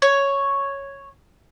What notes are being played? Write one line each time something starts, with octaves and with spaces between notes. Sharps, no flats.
C#5